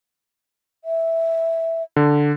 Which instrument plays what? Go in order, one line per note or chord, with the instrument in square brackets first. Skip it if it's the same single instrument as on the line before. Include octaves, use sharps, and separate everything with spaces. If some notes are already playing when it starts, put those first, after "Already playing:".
[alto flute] E5
[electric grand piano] D3